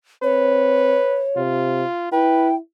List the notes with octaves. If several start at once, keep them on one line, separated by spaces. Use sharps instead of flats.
C4 B4 C#5
C3 F4
E4 B4 G5